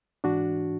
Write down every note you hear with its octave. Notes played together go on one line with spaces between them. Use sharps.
G#2 E3 D4 F#4